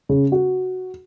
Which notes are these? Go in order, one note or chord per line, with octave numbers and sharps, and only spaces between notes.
C#3
F#4